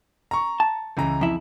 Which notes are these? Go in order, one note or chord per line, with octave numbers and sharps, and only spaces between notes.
A#5 C#6
A5
C#2 E3 A#5
F2 E4